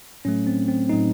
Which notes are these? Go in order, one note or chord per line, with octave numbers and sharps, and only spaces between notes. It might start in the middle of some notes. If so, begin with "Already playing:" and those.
A2 F#3 A3 C#4
C4
C4
A2 F#3 A3 D#4